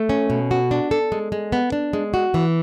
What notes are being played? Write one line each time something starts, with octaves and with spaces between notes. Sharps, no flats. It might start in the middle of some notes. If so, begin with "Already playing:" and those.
Already playing: A3
C#4
B2
F#4
D4
A4
G#3
G#3
B3
D4
G#3
F#4
E3